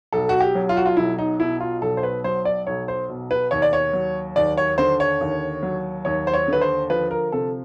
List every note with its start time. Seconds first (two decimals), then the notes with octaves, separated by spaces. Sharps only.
0.13 B1 A4
0.29 F#4
0.40 G4
0.55 F#3
0.69 F4
0.77 F#4
0.86 F4
0.97 B1 E4
1.19 D#4
1.40 B2 E4
1.61 F4
1.82 B1 A4
1.97 C5
2.03 B4
2.24 F#3 C5
2.45 D5
2.67 B1 C#5
2.88 C5
3.09 B2
3.31 B4
3.51 D#2 C#5
3.62 D5
3.73 C#5
3.93 F#3
4.36 D#2 D5
4.57 C#5
4.78 D3 C5
5.00 C#5
5.21 D#2
5.63 F#3
6.05 D#2 C#5
6.27 C5
6.34 C#5
6.48 D3 B4
6.61 C5
6.90 F3 B4
7.11 A#4
7.32 C3 A4